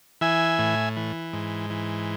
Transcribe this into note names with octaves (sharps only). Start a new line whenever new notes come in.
E3 E5 G#5
A2
E3
G#2
E3